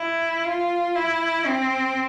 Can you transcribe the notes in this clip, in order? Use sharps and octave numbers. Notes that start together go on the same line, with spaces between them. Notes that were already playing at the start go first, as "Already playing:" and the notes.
Already playing: E4
F4
E4
C4